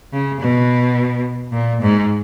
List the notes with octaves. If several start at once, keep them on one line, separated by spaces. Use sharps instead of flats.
C#3
B2
A#2
G#2